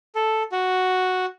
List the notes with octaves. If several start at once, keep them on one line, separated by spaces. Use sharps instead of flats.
A4
F#4